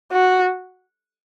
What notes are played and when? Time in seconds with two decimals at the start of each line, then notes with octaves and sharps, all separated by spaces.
0.12 F#4